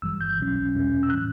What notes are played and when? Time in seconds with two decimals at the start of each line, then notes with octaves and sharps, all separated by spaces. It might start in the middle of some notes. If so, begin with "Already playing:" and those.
0.02 G1 G2 E3 G3 E6
0.21 G6
0.39 B1 B2 F#3 C#4
0.74 E2 B2 G3 C#4
1.03 E6
1.10 A2 E3 F#6